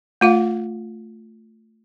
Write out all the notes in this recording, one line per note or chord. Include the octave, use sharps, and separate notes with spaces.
A3 F4 F5